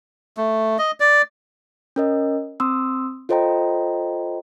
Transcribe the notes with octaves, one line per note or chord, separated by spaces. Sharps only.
A3
D#5
D5
C#4 A#4 D#5
C4 C6 D#6 E6
F4 A4 C5 D#5 G5 A#5